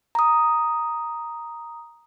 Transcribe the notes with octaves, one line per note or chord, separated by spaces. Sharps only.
A#5 D#6